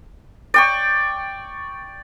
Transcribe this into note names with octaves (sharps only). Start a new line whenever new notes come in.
D5 G5 C#6